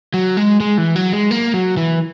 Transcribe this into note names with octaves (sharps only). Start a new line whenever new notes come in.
F#3
G#3
G#3
E3
F#3
G#3
A#3
F#3
E3